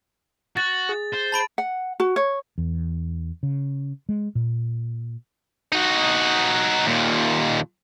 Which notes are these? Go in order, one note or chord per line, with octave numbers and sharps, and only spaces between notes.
F#4 A6
G#4
C5
A5 B5 D7
F#5
F#4
C#5
E2
C#3
G#3
A#2
D#4 F#4
D#2 A#2